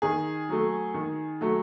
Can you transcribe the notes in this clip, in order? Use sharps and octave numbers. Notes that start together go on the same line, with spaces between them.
D#3 G#4
F#3 A3
D#3
F#3 A3